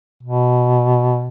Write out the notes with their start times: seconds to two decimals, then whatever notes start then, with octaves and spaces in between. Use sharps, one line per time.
0.23 B2